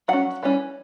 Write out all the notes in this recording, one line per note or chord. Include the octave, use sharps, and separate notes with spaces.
F#3 C#4 F#5
E3 G3 C#4